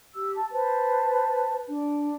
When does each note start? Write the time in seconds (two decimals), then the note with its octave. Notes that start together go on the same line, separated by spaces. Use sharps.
0.15 G4 E6
0.36 A5
0.51 B4 C5 A5
1.68 D4